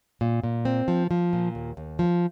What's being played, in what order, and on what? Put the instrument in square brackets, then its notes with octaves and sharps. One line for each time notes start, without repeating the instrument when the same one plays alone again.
[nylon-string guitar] A#2
A#2
C4
F3
F3
A#2
D#2
D#2
F3